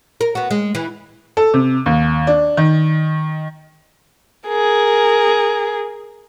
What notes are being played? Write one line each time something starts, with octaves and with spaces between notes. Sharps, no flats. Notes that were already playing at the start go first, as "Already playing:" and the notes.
A#4
B3 F#4
G#3
E3
A4
C3
D#2
D4
D#3
G#4 A#4